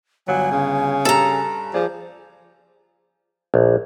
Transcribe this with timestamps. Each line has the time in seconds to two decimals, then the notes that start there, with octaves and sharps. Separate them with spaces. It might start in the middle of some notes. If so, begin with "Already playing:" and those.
0.28 G1 F#3 G#5
0.52 C#3
1.05 G2 A4 A#5
1.74 F3 G#4 D5
3.54 A#1